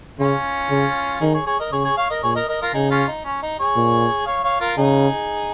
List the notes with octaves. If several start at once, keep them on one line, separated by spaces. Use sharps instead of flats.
C#3 C#4 F4
C#3
D#3 D#4 G#4
G#4 C#5
G#4 C#5
A#4 D#5
C#3 G#4 C#5
G#4 C#5
C#5 F5
A#4 D#5
A#2 G#4 C#5
A#4 D#5
A#4 D#5
F4 A#4
C#3 D#4 G#4
C#4 F4
D#4
C#4
D#4
G#4 C#5
A#2
C#5 F5
C#5 F5
F4 A#4
C#3 D#4 G#4